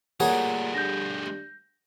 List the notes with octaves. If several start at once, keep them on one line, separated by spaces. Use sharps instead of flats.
A#2 G3 A3 F#4 G#4 A#4 C#5 A#5
G2 G6 A#6